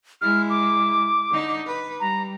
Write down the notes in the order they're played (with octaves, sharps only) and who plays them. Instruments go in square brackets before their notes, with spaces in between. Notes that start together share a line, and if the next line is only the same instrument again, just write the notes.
[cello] G#3 E4 [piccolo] F6
[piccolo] D6
[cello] D3 D#4
B4
[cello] G3 [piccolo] A#5